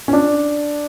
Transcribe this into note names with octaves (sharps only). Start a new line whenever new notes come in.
C#4
D4